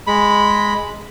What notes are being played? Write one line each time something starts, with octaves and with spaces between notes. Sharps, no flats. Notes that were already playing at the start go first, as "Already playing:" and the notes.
G#3 B5